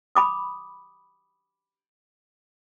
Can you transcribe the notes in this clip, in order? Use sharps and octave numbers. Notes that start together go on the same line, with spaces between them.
B5 D6 D#6